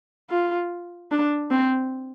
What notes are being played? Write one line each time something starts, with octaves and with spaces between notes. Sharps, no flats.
F4
D4
C4